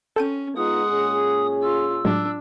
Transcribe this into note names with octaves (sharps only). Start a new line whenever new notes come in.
C#4 A4 G5 D#7
G#3 B3 D#4 F4 F#5 D#6
A#2 C#4 G#4
F4 E6
A2 F#3 G#3 D4